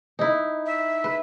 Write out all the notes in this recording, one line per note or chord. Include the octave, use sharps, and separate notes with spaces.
D#4 E4
E5
B4